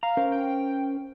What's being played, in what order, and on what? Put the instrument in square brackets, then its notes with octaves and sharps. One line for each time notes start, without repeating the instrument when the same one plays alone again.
[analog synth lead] F5 [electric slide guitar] A#5
[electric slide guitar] C#4 A#4 C5
[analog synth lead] G5